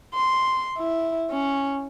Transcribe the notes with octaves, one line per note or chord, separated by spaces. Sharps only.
C6
E4
C#4